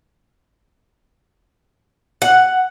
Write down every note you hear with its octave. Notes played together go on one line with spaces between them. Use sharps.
F#5